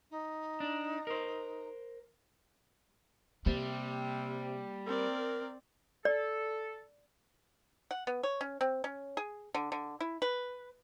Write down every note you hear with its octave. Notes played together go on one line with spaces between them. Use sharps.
D#4
D4
A#4 C5
C3 G3 A#3
C4 A#4 D5
A4 D5
F#5
B3
C#5
C#4
C4
C#4
G#4
D3
D3
E4
B4